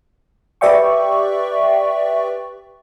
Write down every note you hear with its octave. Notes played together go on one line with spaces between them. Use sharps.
G4 B4 D5 E5 G5 C#6